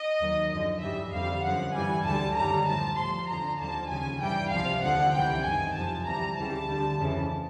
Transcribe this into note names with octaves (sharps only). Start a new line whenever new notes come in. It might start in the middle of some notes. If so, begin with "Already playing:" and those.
Already playing: D#5
D#2 D#3 F#3
F#2 D3 F3 D#5
G2 E3 G3 E5
F2 D3 G3 F5
F#2 D3 F3 F#5
G2 E3 G3 G#5
D2 D3 G3 A5
F#2 D#3 G3 A#5
A2 F3 A5
A2 F3 C6
F2 D3 F3 A#5
D#2 D3 F3 A5
D#2 C#3 F3 G#5
G2 E3 G3 G5
C2 C3 F3 F5
D#2 D3 F3 F#5
C#2 C3 E3 G5
F#2 D#3 F#3 G#5
F2 C3 F3 A5
D2 C3 E3 G3 A#5
D2 C#3 E3 G3 A5
D2 D3 G3
F2 C#3 E3